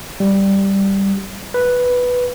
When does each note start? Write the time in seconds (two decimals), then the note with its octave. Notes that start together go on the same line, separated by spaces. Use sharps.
0.20 G3
1.54 B4